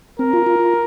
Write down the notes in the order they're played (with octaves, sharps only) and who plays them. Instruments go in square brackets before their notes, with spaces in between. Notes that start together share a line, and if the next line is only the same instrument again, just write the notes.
[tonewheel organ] C4 [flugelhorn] A#4
[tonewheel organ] F4
F4
F4